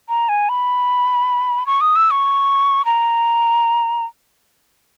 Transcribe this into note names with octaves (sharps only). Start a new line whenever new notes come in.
A#5
G#5
B5
C#6
D#6
E6
C#6
A#5